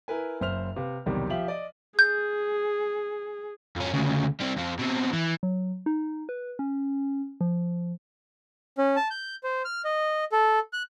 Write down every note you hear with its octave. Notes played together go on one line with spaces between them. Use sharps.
E4 A#4 B4 G#5
F#1 F#2 C5 E5 F6 F7
C3 B4 F5
B1 E2 C3 D#3 G3
F3 G4 E5 F5 F#7
D5 D#5
G#4 G6
F2 C#4
D2 C#3
C3 G3
F2 F3
B2 C4
E3
F#3
D#4
B4
C#4
F3
C#4
A5
G6
C5
F6
D#5
A4
F#6